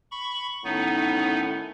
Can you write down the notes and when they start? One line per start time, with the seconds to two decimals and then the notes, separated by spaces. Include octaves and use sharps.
0.11 B5 C#6
0.64 A2 D#3 B3 C#4 D#4